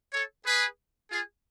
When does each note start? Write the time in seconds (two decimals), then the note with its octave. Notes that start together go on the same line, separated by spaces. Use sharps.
0.13 A4 C#5
0.45 G#4 B4
1.10 F4 G#4